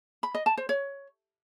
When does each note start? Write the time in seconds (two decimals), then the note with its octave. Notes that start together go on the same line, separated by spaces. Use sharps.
0.23 B5
0.35 D#5
0.46 A5
0.57 C5
0.69 C#5